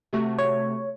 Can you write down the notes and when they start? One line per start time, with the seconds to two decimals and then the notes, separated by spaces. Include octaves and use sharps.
0.13 C3 A3 F#4
0.38 C#5